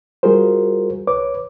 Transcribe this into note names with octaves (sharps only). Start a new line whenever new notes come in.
G3 F4 F#4 G#4 A#4 C5
C2 B4 C#5 D6